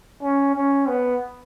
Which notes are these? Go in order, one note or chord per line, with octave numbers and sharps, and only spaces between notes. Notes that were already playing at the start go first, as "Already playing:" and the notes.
C#4
C#4
B3